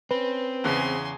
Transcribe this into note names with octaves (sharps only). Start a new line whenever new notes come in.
C4 C#4 B4
E2 C#3 G#5 C6